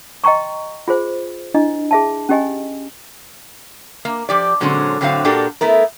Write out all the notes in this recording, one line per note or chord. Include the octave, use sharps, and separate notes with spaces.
D#5 G5 A#5 C6 C#6
F4 G#4 C5
D4 E4 D#5
G#4 E5 A5
C#4 G4 D#5 G#5
A#3
F3 G4 D5
A#2 D3 F#3 G#3 C4 C#4
A2 D3 F#3 C4 E4 F5
A#2 A#3 D4 F#4 G4 A4
A3 B3 E4 A#4